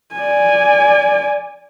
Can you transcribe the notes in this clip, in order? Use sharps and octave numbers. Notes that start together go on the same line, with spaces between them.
D5 G#5